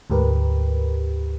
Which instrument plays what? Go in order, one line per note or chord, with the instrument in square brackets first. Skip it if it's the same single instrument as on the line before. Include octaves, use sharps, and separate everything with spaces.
[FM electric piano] D2 G#2 G4 A#4 B4